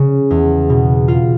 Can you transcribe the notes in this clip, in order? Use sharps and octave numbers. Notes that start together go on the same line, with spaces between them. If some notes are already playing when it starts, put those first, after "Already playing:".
Already playing: C#3
E2
B2
F4